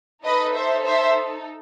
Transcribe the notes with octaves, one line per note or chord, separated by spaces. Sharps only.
D#4 A4 B4 D#5
C5 E5
C5 E5